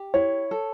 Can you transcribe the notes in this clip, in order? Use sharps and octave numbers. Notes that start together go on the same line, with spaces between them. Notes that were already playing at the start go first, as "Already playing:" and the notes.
Already playing: G4
E4 C#5
A4